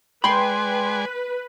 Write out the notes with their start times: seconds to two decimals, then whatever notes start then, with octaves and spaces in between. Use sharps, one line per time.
0.24 G#3 B4 D5 G5 G#5 B5 C6